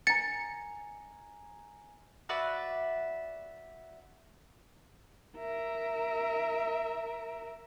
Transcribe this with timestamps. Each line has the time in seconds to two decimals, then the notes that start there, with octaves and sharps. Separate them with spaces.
0.07 G#5 A#5 A6 C#7
2.29 F#4 B4 D5 E5
5.37 A#4 E5